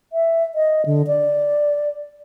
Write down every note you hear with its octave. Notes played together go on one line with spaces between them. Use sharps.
E5
D#5
D3
D5